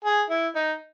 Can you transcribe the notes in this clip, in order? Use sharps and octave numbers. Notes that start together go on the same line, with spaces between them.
G#4
E4
D#4